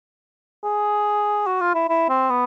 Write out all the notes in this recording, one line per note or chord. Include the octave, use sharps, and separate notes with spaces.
G#4
F#4
F4
E4
E4
C4
B3